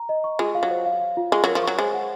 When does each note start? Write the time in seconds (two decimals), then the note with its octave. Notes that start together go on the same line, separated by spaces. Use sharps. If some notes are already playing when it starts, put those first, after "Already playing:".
Already playing: A#5
0.09 D#5
0.24 C#6
0.39 G#3 F4
0.55 F5
0.63 F#3
0.71 C5
0.86 F5
1.01 F5
1.17 F4
1.32 G#3 C#6
1.44 F#3 A#4
1.55 F3
1.63 F#3 C#6
1.78 G#3 C5
1.94 F#5